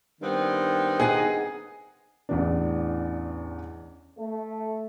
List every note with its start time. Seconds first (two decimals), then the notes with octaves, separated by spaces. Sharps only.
0.22 G2 D#3 B3 C4
1.00 D#4 G#4 F#5 G#5
2.29 A1 E2 D4
4.18 A3